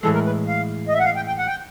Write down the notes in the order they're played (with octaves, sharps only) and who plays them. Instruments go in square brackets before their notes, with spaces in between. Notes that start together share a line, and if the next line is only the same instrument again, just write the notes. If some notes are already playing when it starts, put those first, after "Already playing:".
[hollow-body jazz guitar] A2 E3 G#3 [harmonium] A4
[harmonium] A#4
B4
F5
D#5
E5
F#5
F5
G5
G5
F#5
G5